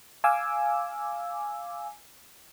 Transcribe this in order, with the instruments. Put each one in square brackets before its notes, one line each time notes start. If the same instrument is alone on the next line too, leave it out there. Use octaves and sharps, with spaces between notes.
[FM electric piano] F5 G#5 D6 E6